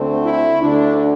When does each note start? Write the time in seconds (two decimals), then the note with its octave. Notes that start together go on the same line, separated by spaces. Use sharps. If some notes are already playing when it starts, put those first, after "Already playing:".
Already playing: D2 D3 A3 C4
0.22 E4
0.60 D2 D3 A3 D4